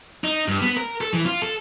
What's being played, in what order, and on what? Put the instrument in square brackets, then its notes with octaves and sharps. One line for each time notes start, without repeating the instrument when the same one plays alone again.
[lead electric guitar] D#4
G2
B3
A#4
A4
E3
F4
A4